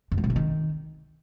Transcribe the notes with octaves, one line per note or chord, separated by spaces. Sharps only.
F#2
F3
A2
C3
D#3